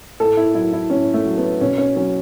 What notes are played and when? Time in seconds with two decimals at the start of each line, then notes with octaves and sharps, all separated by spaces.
0.20 A2 A4
0.37 E4
0.55 F#3 E4
0.73 E4
0.90 A2 C#4
1.14 A3
1.25 F#3
1.37 B3
1.61 B2 C#4
1.78 C#4
1.96 F#3 C#4